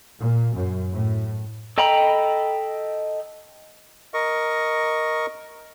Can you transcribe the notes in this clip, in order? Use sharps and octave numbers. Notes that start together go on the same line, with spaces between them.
A#2
F#2
A2
A4 D#5 G5 A#5 B5
A#4 D#5 C#6